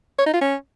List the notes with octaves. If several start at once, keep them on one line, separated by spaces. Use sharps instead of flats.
C#5
D#4
F4
C#4